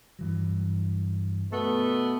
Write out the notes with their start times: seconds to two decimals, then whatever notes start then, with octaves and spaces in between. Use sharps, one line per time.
0.19 G2 E3 F#3
1.51 B2 A3 B3